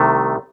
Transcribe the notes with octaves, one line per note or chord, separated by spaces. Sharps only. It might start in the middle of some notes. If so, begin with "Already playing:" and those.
Already playing: C2 C3 D#3 A3